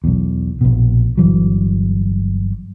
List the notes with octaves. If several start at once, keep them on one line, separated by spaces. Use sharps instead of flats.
B1 E2
A#1 B2
G1 E2 E3 F#3